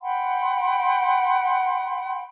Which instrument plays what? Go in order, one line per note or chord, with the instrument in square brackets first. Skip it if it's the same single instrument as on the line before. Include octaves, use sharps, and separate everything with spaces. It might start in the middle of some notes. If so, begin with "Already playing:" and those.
[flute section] F#5 G5 B5 C6